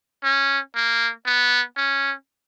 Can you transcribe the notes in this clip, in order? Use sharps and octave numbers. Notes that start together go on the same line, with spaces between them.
C#4
A#3
B3
C#4